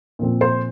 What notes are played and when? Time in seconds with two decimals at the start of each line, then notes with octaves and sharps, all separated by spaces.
0.19 A#2 F3 C4
0.41 C5